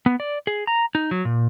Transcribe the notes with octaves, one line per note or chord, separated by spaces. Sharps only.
B3
D5
G#4
A#5
D#4
F#3
A#2